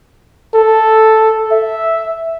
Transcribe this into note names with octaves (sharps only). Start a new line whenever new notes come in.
A4
E5